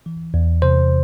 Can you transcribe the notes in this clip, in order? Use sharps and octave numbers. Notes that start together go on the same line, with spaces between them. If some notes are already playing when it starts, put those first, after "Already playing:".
E3
E2
C3 C5